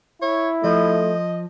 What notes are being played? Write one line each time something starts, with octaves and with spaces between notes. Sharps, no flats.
E4 C#5
F3 A3 D#5